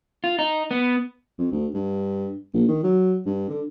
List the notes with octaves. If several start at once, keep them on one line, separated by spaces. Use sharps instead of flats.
F4
D#4
B3
F2
D2
G2
A#1
D#3
F#3
G2
D3